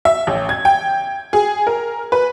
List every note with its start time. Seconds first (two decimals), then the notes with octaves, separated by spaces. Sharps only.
0.05 E5
0.27 A1
0.49 G#6
0.65 G5
1.33 G#4
1.67 A#4
2.12 B4